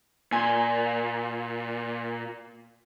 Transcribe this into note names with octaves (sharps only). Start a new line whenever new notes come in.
A#2 G#5 C6